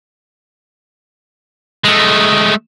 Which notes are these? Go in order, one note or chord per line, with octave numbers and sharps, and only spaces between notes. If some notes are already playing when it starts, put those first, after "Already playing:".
G#3 A3